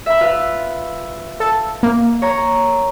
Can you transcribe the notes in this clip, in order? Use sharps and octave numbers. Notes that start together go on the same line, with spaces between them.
E5 B5
F4 B4 F5
A4
A#3
C#5 A#5